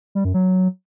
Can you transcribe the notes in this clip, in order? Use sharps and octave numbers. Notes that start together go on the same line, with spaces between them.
G3
F#2
F#3